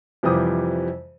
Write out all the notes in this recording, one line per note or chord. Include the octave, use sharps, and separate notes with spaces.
F2 C3 E3 F3 G3 D#6